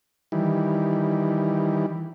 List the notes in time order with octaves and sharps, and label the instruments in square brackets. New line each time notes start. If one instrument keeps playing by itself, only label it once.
[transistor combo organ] D#3 E3 G3